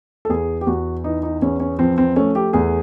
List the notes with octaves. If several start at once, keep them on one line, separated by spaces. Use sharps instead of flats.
A4
E2 G#4
G4
E2 F#4
E3 D#4
D#4
E2 C#4
C#4
F3 C4
C4
A3 C#4
G4
E2 G#4